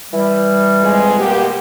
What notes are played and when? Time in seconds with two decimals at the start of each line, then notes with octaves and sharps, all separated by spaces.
0.12 E3 G3
0.81 F2 G#3
1.19 B2 A#3 G4